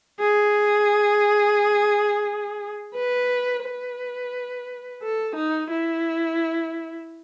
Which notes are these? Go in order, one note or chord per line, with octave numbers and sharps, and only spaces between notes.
G#4
B4
B4
A4
D#4
E4